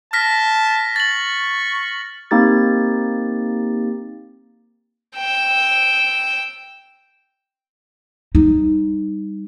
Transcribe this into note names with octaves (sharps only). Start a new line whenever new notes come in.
A5 F6 A#6 B6
C#6 A6 F#7
A#3 C4 D#4 G4 A6
G5 E6
G3 D#4